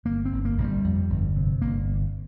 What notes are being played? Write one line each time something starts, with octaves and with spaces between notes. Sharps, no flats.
G1 A#3
C4
G1
A#3
G1 A#3
G3
F2
G1
C3
G1 A#3